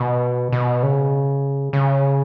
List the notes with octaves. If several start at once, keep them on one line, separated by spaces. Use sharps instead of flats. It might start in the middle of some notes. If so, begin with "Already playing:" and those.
Already playing: B2
B2
C#3
C#3